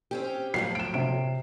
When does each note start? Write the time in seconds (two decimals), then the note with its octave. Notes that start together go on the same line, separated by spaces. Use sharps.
0.11 C4 C#4 G4
0.54 A2 F3 F#3 C7
0.75 D7 E7
0.94 C3 D7